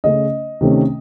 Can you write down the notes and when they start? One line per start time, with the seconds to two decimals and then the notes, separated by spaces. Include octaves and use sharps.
0.04 C#3 A3 C#4 D#5
0.61 C3 D#3 A3 C#4